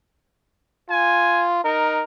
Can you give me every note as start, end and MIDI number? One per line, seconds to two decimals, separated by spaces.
0.90 1.63 65
0.90 1.45 80
1.65 2.02 63
1.65 2.03 70